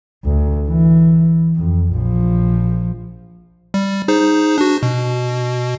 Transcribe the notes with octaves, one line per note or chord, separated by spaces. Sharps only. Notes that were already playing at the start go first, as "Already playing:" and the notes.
D2
E3
F2
A#1 F3
G3
D#4 G#4 C5
D4 F#4
B2